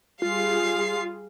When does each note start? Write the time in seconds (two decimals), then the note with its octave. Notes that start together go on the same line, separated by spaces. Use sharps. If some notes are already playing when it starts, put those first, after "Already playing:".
0.22 G3 F4 G#4 F5 C7